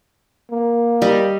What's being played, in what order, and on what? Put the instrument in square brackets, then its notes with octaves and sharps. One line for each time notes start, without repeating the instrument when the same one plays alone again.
[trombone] A#3
[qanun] G3 D#5